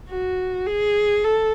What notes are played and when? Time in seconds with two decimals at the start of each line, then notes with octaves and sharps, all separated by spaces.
0.09 F#4
0.66 G#4
1.24 A4